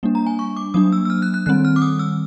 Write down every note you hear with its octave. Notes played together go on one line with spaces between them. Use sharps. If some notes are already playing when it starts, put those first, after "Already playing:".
G3 A#3 D4
A#5
G#5
C#6
D6
F#3 A#3 D4 D#6
E6
E6
F6
F#6
F#6
D#3 G3 C4 F#6
F6
D6
D#6
E6